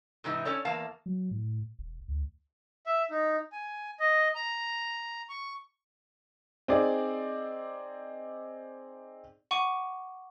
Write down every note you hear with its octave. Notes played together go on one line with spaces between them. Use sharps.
G#2 C3 E3 D#4
C#4 A4 C#5 D5
E2 A#3 F5 A5
F#3
A2
E1
D2
E5
D#4
G#5
D#5
A#5
C#6
C4 D#4 G#4 D5
F#5 C#6 D6 D#7